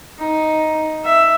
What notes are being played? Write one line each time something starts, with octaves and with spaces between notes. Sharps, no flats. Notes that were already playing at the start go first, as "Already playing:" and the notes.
D#4
E5